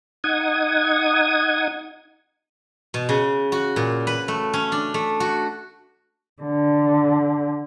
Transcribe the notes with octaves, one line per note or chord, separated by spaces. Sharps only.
D#4 F#5 D#6 G#6
B2
C#3
F#4
A#2
B4
A3
C#4
D4
A3
F#4
D3